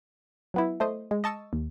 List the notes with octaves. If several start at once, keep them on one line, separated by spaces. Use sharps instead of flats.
F#3 B3 E4
A3 C5 D#5
G#3
D#5 A5 C#6 E6
D#2